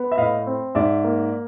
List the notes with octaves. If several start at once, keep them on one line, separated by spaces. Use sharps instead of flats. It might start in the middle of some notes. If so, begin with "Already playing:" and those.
Already playing: B3
E5
A2 D#5 F5
C4
G#2 D5 E5
A#3